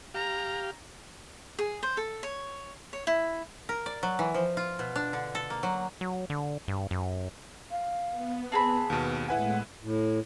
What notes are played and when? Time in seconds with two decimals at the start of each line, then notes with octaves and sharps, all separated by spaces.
0.14 G4 F5 A#5
1.59 G#4
1.83 C5
1.97 A4
2.23 C#5
2.93 C#5
3.07 E4
3.69 A#4
3.86 D5
4.03 F#3
4.19 E3
4.34 F3
4.57 F4
4.79 B2
4.96 D4
5.13 D3
5.35 A4
5.50 A#3
5.63 F#3
6.01 F#3
6.30 D3
6.68 G2
6.91 F#2
7.71 F5
8.11 B3
8.52 C4 G#4 A5 B5
8.90 D#2 B2
9.29 A2 G#3 E4 B4 F#5 G#5
9.82 A2